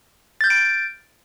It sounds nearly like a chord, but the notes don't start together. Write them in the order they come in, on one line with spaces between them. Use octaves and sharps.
A6 G6 F6 D7